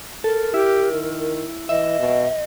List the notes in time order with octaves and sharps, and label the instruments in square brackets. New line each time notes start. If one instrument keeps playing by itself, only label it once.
[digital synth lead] A4 [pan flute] A#4
[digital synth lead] E4 [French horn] G4
[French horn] D#3
[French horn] E3 [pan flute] D#5 [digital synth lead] E5
[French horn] B2